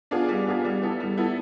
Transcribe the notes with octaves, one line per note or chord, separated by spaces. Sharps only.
B3 D4 F4 G#4
G3
B3 D4 F4 G#4
G3
B3 E4 A4
G3
B3 E4 A4